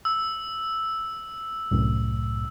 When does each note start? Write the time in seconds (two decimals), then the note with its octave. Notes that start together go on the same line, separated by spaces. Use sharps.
0.05 E6
1.71 C2 F#2 A2